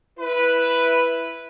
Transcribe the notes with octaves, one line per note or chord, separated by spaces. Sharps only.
E4 B4